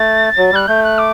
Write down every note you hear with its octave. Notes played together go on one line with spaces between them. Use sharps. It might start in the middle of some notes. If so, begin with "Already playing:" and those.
Already playing: A3 A6
F#3
G3 F#6
A3 G6
F#6
D6